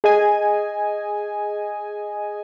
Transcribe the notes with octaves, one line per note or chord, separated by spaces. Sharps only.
G#4 D#5 G#5